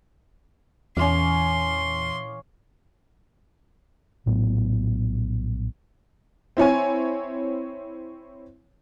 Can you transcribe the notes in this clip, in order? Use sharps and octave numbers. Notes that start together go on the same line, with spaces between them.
E2 A#2 E3 C#4 F5 C6 D6
A#1 A2 F#3 B3
C4 E4 C#5 G#5